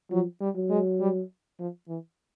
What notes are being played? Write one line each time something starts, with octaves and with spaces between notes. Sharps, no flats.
F3 F#3
G3
F#3
G#3
G3
F3
E3